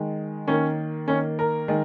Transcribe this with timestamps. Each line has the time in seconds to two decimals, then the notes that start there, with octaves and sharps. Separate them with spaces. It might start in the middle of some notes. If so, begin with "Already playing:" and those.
Already playing: D#3 G#3
0.48 D#3 A#3 C#4 C#5
1.08 D#3 A#3 C#4 C#5
1.39 A#4
1.68 D#3 G#3